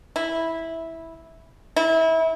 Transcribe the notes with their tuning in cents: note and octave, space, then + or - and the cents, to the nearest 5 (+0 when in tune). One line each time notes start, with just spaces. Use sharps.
E4 -10
E4 -25